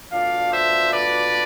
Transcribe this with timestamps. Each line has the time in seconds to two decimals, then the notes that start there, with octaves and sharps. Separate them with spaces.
0.12 B2 A3 D4 F4 D5 F5
0.52 C5 E5
0.92 B4 D5